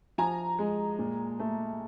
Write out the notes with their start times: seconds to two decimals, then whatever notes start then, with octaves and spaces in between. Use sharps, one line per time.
0.18 F3 G#5 A#5
0.59 G#3
0.99 A#2
1.39 A3